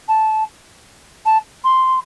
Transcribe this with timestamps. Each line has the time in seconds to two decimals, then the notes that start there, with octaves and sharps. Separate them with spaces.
0.08 A5
1.26 A5
1.64 C6